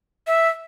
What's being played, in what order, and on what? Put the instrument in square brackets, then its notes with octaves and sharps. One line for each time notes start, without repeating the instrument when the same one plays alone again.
[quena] E5